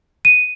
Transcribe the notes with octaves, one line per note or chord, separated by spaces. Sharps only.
D#7